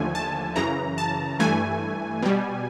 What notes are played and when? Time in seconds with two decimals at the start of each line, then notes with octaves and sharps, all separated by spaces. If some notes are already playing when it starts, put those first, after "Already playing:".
Already playing: D#2 D3 F3 A3 G#5
0.15 A5
0.56 F#2 C#3 E3 A#5
0.98 A5
1.40 G2 E3 A3 G#5
2.22 B2 G3